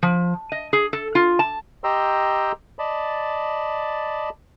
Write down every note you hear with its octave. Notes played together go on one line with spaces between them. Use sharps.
F3
D#5
G#4
A4
F4
A5
G4 D#5 G5 A#5 C6 E6
D5 D#5 A5 B5